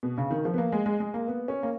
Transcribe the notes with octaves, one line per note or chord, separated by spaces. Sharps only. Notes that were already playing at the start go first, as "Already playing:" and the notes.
B2
C#3
D#3
F3
B3
A#3
G#3
G#3
G#3
A#3
B3
C#4
A#3